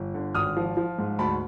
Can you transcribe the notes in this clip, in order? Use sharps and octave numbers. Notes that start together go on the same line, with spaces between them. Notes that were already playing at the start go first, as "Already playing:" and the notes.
Already playing: G1
D3
G#1 D#6 F6
F3
F3
G#2
D2 A5 B5